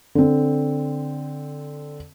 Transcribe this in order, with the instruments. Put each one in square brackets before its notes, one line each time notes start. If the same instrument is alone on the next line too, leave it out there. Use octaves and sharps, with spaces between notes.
[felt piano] D3 C4